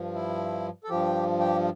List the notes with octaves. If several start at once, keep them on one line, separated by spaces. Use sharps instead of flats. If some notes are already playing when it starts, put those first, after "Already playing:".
Already playing: G2 F3
E4
A4
G2 F3 G4
G4